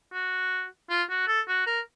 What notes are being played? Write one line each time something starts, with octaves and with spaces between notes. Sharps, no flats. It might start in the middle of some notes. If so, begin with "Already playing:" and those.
F#4
F4
F#4
A4
F#4
A#4